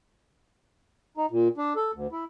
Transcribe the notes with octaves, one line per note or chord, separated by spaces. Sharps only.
D#4
A#2
D4
A4
D2
E4